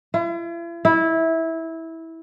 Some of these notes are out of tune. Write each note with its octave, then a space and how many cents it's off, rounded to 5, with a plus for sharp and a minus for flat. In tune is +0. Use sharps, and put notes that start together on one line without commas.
E4 +45
E4 -15